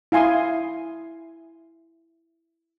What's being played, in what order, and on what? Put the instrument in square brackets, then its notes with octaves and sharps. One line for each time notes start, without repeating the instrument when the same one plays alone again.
[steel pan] E4 F5 G#5 C6 D#6